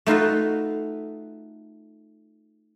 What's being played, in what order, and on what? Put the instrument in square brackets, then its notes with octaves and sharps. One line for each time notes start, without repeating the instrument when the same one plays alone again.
[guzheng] A3 D#4 F4 F#4 B4